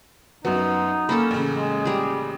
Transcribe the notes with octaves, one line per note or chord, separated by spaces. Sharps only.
F#2 F#3 B3 D#4
A#3 C#4 A4 B5
A1 C#3
G#3
G3 G#4